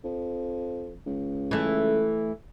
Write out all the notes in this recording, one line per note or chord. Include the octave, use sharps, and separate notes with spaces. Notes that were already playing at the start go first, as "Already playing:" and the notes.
F2
C#2
E3 A3